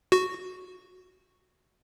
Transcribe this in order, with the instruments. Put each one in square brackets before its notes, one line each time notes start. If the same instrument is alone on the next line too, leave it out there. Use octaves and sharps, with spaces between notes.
[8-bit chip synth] F#4